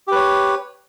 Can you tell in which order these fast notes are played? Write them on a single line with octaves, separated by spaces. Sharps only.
G4 B4 C#5